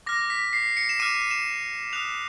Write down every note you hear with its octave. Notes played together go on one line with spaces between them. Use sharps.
D6 F6 A#6
B6
C7
C#7
E7
D6 F6 D#7
D#7
E7
D#6 F#6 F7